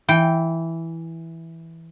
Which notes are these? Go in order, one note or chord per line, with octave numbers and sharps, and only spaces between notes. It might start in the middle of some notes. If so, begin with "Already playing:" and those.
E3 G5